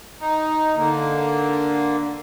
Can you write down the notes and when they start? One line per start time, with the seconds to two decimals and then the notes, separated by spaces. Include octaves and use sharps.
0.21 D#4
0.76 D3 A#3